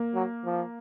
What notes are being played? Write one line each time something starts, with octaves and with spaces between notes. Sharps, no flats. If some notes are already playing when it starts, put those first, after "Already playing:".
Already playing: A#3
F#3
F3